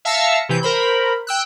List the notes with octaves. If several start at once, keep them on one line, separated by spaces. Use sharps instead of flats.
E5 F5 A5 E6 A#6 C#7
C3 E3 G6
A#4 C5 B5
G5 E6 F#6